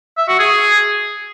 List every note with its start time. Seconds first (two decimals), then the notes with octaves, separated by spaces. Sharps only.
0.18 E5
0.29 F#4
0.39 G#4